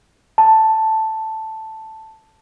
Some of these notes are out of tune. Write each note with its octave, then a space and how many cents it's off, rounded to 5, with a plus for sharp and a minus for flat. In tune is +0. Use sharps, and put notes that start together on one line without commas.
A5 +0